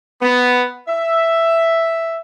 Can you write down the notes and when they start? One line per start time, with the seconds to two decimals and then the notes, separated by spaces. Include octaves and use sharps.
0.21 B3
0.88 E5